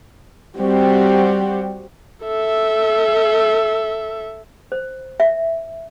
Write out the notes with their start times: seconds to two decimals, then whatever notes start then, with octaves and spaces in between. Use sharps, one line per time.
0.59 G3 C4 F#4 G4
2.25 A4 E5
4.72 C5
5.20 E5